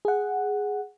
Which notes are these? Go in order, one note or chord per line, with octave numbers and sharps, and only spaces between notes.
G#4 F#5